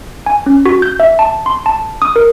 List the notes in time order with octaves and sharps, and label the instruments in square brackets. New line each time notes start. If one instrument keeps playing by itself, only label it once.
[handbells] G#5
C#4
F#4
G6
E5
A5
C6
A5
D#6
A#4